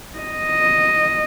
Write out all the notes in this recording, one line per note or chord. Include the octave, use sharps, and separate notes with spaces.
D#5